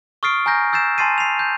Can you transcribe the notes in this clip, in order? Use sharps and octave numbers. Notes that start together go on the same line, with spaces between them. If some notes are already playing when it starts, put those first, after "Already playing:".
C#6 D#6 F6 A6 C7 D7
G#5 A#5 F6 G6 A#6
E6 G6 A6 C7 E7
G#5 A5 C6 A6 C7 D#7
C7 F7
G6